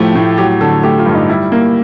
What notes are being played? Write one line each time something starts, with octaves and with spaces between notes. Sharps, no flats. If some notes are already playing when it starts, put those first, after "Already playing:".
Already playing: A2 F3 A3 G4
A2
F#3 G4
D3 A4
A3 G4
F4
G2
D#4
G3 E4
A#3